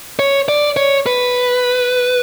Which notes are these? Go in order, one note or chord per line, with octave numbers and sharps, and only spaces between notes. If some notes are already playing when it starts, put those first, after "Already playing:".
C#5
D5
C#5
B4